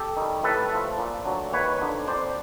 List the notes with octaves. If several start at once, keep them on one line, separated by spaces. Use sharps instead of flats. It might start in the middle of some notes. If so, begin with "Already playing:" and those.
Already playing: G4 A4
D#3 G3
A2 A4 B4
F3 A3
A#2
F#3 A3 D4
D#2 B4 C#5
D3 F3 A#3 D#4
F2 C5 D5